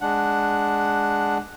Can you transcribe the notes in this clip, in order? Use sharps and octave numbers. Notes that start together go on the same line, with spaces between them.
G#3 D4 F#5